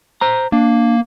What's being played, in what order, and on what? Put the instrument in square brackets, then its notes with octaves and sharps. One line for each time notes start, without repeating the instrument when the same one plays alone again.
[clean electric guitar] C5 A#5
[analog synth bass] A#3 [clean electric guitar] D4